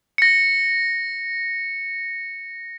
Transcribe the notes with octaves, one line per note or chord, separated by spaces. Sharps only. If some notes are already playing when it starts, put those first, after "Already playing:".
A#6 C#7